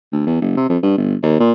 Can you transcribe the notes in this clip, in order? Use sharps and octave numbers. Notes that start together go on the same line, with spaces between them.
D2
E2
F#1
C3
F2
G2
G1
D#2
A#2